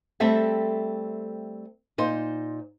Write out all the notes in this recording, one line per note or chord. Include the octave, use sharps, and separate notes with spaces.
G3 A3 C4 A4 E5 G5
A#2 D#4 C5